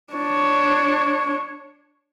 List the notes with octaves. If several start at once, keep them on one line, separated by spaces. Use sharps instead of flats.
D4 C#5